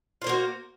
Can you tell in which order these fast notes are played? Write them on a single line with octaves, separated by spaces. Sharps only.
F4 C5 A#3 F#4